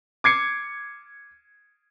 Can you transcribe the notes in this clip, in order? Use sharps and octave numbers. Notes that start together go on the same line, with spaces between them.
D6 G#6 C7 C#7